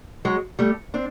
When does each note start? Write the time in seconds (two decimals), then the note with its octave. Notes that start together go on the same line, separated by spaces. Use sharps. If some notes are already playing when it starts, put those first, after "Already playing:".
0.25 F#3 G#3
0.59 G3 A3
0.94 C4 D4